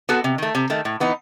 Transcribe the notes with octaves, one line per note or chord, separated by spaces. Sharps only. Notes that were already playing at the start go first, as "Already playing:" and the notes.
B3 F#4 A4
C3
D#3 A3
C3
D#3 A3
A2
E3 B3 D#4